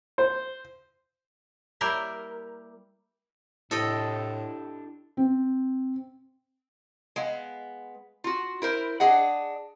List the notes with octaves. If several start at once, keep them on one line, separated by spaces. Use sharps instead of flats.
C5
G3 A#3 E4 G4 A#4
A2 D4 E4 G4 A4 D#5 G5
C4
G#3 B3 F5
F4 F#4
E4 A#4 C5
D4 G#4 D#5 F#5